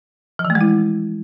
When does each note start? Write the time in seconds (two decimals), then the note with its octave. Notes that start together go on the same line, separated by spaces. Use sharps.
0.39 F3
0.45 E3
0.50 A3
0.55 G#3
0.61 E4